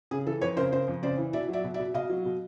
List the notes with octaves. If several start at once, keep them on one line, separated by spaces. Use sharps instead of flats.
C#3 G#4
E3 A4
F2 B4 C#5
C#3 A#4 C5
C#3 A#4 C5
F2
C#3 C5 D5
E3
B2 D5 E5
F#3
D5 E5
B2
D5 E5
B2
B2 D#5 F5
F#3
B2